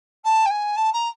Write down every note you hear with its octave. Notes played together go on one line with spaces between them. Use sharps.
A5
G5
G#5
A5
A#5